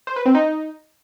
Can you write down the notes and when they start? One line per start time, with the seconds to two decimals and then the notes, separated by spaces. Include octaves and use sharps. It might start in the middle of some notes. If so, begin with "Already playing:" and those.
0.07 C5
0.16 B4
0.25 C4
0.35 D#4